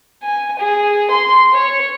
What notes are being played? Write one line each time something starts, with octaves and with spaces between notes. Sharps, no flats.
G#5
G#4
C6
C#5